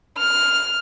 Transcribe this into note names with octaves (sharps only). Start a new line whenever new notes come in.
F6